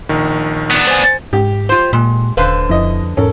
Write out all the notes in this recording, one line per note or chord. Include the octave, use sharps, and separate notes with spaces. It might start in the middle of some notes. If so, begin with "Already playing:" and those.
A#1 D#3
B3 D4
C5 G#5
G#2 G4
F4 C5
A#2 G#3
D#1 D3 B4 C5 F5
F2 E4 D#5
E1 G#2 C#4 A4 A#4